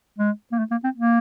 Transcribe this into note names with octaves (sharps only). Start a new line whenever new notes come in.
G#3
A#3
A3
A#3
C4
A#3